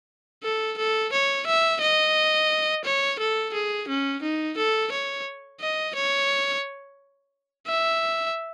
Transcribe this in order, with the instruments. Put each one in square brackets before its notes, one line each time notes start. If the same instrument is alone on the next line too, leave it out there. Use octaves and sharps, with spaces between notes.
[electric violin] A4
A4
C#5
E5
D#5
C#5
A4
G#4
C#4
D#4
A4
C#5
D#5
C#5
E5